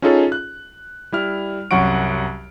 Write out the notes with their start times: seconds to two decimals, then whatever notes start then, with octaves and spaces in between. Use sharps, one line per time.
0.02 C#4 D#4 F4 G#4 A4 C#5
0.32 F#6
1.12 G3 E4 F6
1.71 C2 F#2 F#3 F#5 C#6 D7